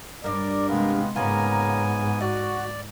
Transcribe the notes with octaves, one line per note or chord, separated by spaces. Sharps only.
G2 D4 A#4 D5
C3 G#3 B3 G4 F5
G#2 C#3 A#3 B3 F4 G#5 A#5
F#4 D5 D#5